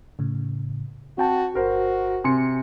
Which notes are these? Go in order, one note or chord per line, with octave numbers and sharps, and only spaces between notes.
A2 C#3
C4 F#4 G5 A5
G1 F#4 A#4 C5
C3 G#5 C6 C#7